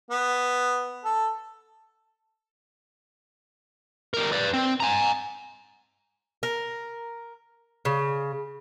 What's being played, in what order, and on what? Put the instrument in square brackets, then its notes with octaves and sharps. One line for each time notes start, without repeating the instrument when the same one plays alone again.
[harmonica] B3
A4
[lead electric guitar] G3 A#4
B4 D5
C4
G#5 A#5
[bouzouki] A#4
C#3